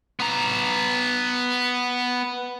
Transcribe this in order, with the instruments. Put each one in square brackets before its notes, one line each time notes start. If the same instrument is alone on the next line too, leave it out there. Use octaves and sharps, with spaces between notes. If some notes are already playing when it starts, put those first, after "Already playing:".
[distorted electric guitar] B3 A#5